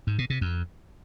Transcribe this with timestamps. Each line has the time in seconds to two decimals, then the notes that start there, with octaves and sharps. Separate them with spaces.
0.07 G#2
0.18 B2
0.30 C3
0.41 F2